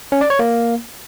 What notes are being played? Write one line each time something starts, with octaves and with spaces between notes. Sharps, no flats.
C#4
D5
C#5
A#3